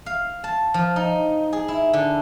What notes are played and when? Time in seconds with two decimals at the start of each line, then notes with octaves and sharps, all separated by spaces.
0.06 F5
0.44 A5
0.74 F3
0.96 D#4
1.53 G#4
1.68 E4
1.93 D3